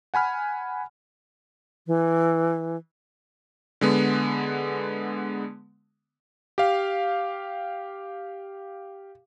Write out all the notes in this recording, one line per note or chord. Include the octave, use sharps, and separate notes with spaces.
F#5 G#5 B5 F6
E3
D3 G#3 B3
G4 F5